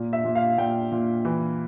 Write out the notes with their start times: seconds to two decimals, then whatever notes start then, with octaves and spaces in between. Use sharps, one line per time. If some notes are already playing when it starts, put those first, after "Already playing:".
Already playing: A#2
0.13 E5
0.24 A#2
0.35 F5
0.58 A#2 G5
0.92 A#2
1.25 E3